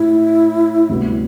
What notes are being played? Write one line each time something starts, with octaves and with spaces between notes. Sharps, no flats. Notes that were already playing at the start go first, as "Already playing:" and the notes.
Already playing: A2 E4
D2 C3 G3 B3 F#4